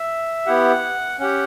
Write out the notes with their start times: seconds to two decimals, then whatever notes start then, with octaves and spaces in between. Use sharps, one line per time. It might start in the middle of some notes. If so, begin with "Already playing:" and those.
Already playing: E5
0.46 B3 E4 G4 F#5
1.19 C#4 G4 F#5